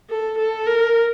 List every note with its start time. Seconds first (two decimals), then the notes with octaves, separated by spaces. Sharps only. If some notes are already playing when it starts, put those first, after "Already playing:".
0.10 A4
0.38 A4
0.67 A#4